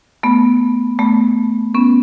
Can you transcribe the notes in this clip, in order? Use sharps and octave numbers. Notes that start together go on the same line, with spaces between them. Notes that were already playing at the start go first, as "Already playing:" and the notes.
A3 B3
A3 B3
B3 C#4